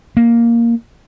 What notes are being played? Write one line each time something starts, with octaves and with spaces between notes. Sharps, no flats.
A#3